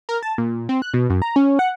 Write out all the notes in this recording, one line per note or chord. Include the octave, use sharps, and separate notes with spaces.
A#4
A5
A#2
C4
F#6
B2
F#2
A#5
C#4
F#5